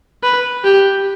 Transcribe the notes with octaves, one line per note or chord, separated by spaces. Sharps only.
B4
G4